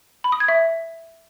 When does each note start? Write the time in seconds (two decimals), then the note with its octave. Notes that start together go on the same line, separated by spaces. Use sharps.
0.24 B5
0.32 D#6
0.40 G#6
0.48 E5